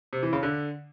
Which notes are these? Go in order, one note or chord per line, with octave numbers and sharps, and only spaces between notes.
C3
E3
C#3
D3